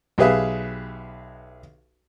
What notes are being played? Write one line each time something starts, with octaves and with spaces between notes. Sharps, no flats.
B1 G4 G#4 B4 E5 F5